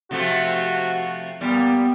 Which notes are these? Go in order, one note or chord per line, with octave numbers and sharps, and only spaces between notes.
C3 F3 A3 F#4
A#2 G3 B3